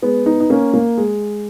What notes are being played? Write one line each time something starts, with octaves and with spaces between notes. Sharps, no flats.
G#3 B3
B3 D#4
D#4
A#3 C#4
A#3
G#3